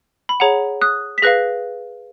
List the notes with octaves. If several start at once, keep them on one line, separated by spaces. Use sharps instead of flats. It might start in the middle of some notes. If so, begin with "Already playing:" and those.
B5
G#4 C#5 F#5 A#5
D#6 F#6
B6
G#4 B4 F5 F#6 A#6